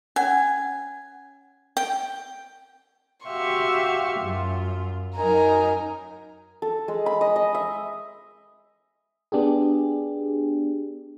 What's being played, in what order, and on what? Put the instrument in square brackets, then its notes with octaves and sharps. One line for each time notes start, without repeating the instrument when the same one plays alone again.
[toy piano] C#4 C#5 F#5 [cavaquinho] G#5
[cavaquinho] G5
[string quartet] F#4 G4 E5 F5 C6 C#6
F#2 F4
F#2 F#3 D#4 A#4 G#5 A#5
[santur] A4
G#3
B5
D#5
D#5
E5
[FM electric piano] B3 D4 G4 G#4